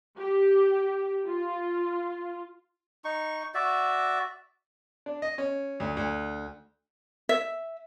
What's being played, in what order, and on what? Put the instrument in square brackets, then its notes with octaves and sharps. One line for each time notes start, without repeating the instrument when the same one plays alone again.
[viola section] G4
F4
[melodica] D#4 C#6
F#4 D5 E5
[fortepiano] D4
D#5
C#4
D2
D2
[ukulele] E5